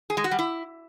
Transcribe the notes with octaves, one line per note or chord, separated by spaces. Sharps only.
G#4
G#3
F#4
G3
E4